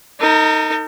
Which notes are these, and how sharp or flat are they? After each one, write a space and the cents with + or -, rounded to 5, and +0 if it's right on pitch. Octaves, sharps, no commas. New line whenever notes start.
D#4 +10 A#4 -45